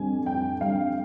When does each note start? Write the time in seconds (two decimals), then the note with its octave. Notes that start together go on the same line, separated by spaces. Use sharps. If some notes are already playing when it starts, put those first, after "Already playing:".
Already playing: F2 D3 G3 G#5
0.26 F2 G5
0.61 D3 G3 F5